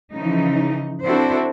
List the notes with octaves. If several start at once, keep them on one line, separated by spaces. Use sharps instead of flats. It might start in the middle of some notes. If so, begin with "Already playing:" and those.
C#3 E3 F3 D#4
C4 D4 E4 F#4 A4 C5